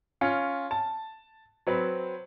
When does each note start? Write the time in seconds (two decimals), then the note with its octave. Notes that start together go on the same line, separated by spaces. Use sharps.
0.21 C#4 F4
0.71 A5
1.67 F#3 C4 B4